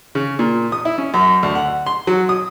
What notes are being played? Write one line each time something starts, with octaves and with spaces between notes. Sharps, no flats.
C#3
A#2
D#6
E4
C#4
F#2
D2
F#5
C6
F#3
D#6